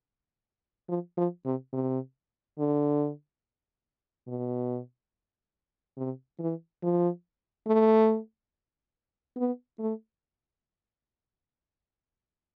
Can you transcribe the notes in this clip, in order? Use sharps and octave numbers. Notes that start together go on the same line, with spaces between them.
F3
F3
C3
C3
D3
B2
C3
E3
F3
A3
B3
A3